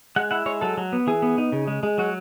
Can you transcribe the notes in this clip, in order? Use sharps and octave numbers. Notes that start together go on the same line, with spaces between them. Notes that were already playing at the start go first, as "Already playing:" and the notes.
G#3 F#5
E4 F#5
G#3 C#5
F#3 A4
F#3
B3
E3 G#4
B3
D#4
C#3
G#3
G#3
F#3 F#4